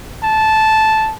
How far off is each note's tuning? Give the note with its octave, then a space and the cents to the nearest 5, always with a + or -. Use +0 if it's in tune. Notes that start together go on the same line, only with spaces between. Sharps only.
A5 -10